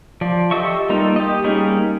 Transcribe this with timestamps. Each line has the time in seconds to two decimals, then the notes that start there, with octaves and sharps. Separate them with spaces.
0.21 F3 D5
0.51 G4 A4 D#5 E5 C#6
0.89 G3 A#3 D#4 F4 A4
1.16 G4 D#5
1.44 G3 A#3 C#4 D#4 G#4